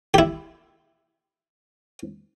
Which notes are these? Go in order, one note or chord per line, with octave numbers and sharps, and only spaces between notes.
E4 G4